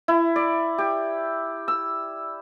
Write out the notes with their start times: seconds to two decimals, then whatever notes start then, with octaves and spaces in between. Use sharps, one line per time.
0.08 E4
0.36 D5
0.78 G4
1.68 E6